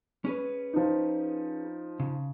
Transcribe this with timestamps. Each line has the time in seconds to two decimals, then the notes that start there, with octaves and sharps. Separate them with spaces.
0.25 C#4 G#4 B4
0.73 F3 D#4
2.00 C#3